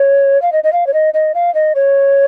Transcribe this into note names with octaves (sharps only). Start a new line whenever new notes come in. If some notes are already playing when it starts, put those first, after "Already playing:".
Already playing: C#5
F5
D#5
D#5
F5
C#5
D#5
D#5
F5
D#5
C#5